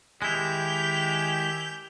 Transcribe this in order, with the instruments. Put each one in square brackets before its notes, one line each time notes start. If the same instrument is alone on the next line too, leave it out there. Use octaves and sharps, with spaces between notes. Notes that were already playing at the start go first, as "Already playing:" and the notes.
[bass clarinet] D#3 [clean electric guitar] G#3 E4 [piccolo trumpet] G4 [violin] G6 F7